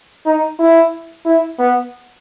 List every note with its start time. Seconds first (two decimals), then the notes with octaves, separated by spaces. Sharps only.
0.26 D#4
0.59 E4
1.26 E4
1.59 B3